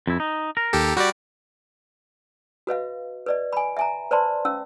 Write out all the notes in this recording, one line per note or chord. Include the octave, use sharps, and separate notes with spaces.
F2 E4
D#4
A#4
D#2 G4 A4
G3 F#4 G4 D5
F#4 B4 D#5 F5
B4 D5 D#5
G#5 B5
E5 G#5 A#5
B4 C5 D5 A5 B5 C6
C#4 F5 E6